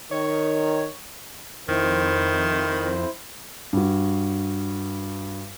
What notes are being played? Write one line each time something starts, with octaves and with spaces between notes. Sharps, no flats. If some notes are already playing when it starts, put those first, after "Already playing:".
D#3 C#5
F2 D#3 E4 C5
G2 F#4